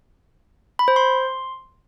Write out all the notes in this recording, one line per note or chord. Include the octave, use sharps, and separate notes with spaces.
B5
C5
C6